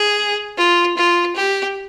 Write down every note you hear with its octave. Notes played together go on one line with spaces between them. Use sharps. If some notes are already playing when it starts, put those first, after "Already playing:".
Already playing: G#4
F4
F4
G4